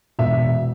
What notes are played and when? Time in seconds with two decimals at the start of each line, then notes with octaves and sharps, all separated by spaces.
0.19 E1 E5